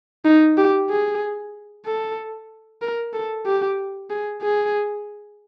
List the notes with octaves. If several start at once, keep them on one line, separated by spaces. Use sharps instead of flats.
D#4
G4
G#4
A4
A#4
A4
G4
G#4
G#4